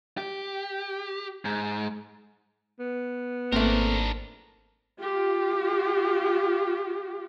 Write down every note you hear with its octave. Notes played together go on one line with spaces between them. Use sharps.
G4
G#2
B3
G#1 A3 A#3 C4 D4 A#4 C5
F4 G4